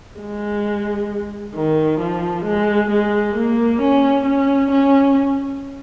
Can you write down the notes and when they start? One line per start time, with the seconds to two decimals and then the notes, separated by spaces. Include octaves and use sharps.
0.20 G#3
1.55 D#3
2.00 F3
2.45 G#3
2.90 G#3
3.36 A#3
3.81 C#4
4.26 C#4
4.71 C#4